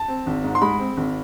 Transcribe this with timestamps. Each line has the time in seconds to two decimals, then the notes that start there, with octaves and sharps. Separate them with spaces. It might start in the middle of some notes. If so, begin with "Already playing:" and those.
Already playing: A5
0.08 C4
0.26 G#1
0.44 G#2
0.55 C6
0.62 G#3 B5
0.79 C4
0.97 G#1